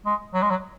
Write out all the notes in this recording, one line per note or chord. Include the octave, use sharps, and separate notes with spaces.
G#3
F#3
G#3
F#3